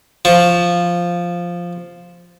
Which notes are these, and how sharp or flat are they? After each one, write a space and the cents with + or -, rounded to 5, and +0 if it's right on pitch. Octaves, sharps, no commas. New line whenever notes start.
F3 +0 C#6 +0